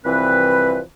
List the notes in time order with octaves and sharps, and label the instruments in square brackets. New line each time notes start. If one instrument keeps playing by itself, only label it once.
[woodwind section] C2 E3 F3 C4 B4